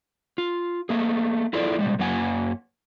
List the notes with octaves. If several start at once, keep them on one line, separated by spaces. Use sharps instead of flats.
F4
A3 A#3 G#4
E4 F4 G#4 A4 D5
B2 G3 G#3
F#2 F#3 A#3 F#5 G#5